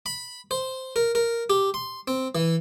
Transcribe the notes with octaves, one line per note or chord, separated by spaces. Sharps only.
B5
C5
A#4
A#4
G4
C6
C4
E3